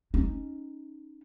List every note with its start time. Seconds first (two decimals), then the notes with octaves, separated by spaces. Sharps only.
0.14 C#4 D#4